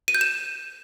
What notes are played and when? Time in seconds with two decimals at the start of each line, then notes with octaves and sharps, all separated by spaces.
0.08 D#7
0.15 G6
0.21 E7